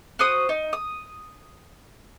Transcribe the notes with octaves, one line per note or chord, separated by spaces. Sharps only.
F#4 C5 D#6
D#4
D#6